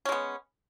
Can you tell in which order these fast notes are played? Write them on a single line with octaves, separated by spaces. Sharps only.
C#4 G#3 B3